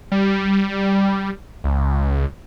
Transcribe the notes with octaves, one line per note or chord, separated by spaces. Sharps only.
G3
C#2